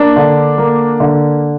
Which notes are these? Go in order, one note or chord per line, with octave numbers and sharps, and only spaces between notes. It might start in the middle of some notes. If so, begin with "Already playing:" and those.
Already playing: A#3 D4
D3
A#3
D3